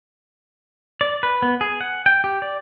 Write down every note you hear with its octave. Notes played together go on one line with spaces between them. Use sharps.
D5
B4
B3
G#4
F#5
G5
G4
D5